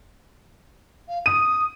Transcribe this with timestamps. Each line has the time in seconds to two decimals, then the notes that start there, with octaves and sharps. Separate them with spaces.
1.08 F5
1.26 D#6 D#7